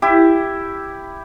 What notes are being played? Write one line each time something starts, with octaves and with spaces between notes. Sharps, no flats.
E4 G4